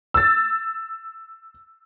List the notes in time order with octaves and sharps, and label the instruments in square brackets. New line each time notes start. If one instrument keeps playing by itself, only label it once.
[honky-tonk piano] E6 A6